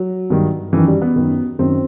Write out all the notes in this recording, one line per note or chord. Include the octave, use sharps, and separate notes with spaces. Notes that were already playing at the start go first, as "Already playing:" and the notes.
Already playing: F#3
G2 D#3
F#2 D#3 E3
G3
B3
F#2 D#3
F#2 D#3 C4